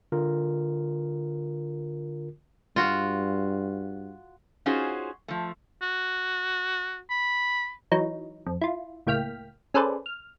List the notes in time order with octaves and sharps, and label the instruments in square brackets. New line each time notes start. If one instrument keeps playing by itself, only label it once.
[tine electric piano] D3 F4 A#4
[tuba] G2 [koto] F4 F#4
[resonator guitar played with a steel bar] C#4 D#4 F4 F#4 G#4 C5
F3 A3
[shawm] F#4
B5
[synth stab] E3 F#3 D#4
F2
E4 F4
C#2 A2 A#3 G5 F6 B6
C#4 G#4 A4 B4 C5 D5
F6